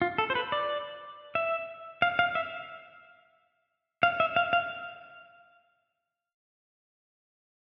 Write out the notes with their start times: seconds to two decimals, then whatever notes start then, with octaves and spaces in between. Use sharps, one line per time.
0.02 F4
0.18 A4
0.30 C5
0.35 B4
0.52 D5
1.35 E5
2.02 F5
2.19 F5
2.35 E5
4.03 F5
4.20 E5
4.36 F5
4.53 F5